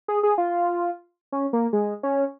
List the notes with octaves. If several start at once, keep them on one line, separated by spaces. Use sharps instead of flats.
G#4
G#4
F4
C#4
A#3
G#3
C#4